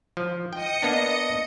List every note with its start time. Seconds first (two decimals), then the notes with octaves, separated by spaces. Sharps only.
0.17 F3
0.53 D#5 G5 D#6 C#7
0.82 A#3 B3 D4